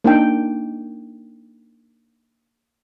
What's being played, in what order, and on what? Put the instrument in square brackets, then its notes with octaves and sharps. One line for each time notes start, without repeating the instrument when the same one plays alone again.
[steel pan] A#3 D4 D#4 G5